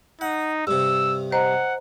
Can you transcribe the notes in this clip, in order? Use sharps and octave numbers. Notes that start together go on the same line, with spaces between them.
D#4 F#5
G2 C3 E6
C5 D#5 F#5 A#5